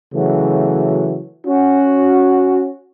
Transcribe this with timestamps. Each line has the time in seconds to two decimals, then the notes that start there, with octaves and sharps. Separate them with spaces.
0.14 C#3 E3 F#3 A3 F#4
1.47 C#4 F#4